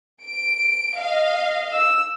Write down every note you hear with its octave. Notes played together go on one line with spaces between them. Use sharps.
D7
D#5 F5
E6